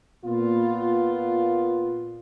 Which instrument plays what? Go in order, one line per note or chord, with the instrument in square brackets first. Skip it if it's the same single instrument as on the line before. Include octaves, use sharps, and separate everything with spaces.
[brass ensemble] A#2 B3 F4